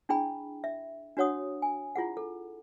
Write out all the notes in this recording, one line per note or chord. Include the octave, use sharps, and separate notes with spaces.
D4 E4 G#4 G5 B5
E5
D4 F#4 C#5 F#5 D#6
G#5
E4 F4 G#4 F#5
A4